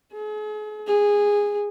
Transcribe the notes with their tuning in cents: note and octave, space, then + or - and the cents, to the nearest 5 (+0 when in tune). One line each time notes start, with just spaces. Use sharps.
G#4 +40
G#4 -15